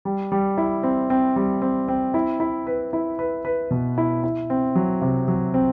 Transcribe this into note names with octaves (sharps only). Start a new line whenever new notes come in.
G3
G3
E4
C4
C4
G3
C4
C4
E4
E4
B4
E4
B4
B4
B2
E4
E4
C4
F#3
C3
F#3
C4